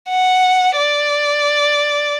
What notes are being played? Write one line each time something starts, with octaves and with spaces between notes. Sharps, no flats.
F#5
D5